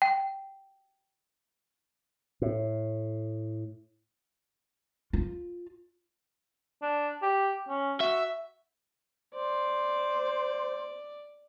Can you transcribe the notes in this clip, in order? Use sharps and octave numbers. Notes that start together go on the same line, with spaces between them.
G5
A2
F4
D4
G4
C#4
F#4 E5
C5 D5